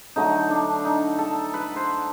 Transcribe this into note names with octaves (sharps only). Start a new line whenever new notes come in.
D3 F#3 A3 D#4
D4
D#4
A4
B4
C5